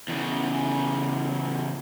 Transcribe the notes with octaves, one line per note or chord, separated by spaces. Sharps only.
E2 C#3